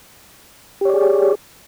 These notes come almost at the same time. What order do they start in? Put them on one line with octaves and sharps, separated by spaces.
G4 C#5 D5 G#4